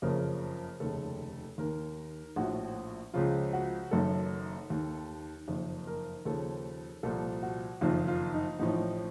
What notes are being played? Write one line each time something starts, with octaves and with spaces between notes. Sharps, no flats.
F#1 F2 C#3 F3 A#4
F1 D#2 C#3 A4
D#2 D#3 A#4
A#1 A2 F3 F#4
C#2 C#3 F3 F4
F#4
F#1 F#2 D#3 A4
D#2 D#3
F#1 F2 D#3
A#4
D#2 C#3 F3 A4
C2 A#2 F3 A4
F#4
F#1 F2 D#3 F4
F4
D#4
A1 A2 F3 D#4